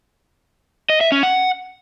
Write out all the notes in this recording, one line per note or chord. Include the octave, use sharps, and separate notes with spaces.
D#5
E5
C#4
F#5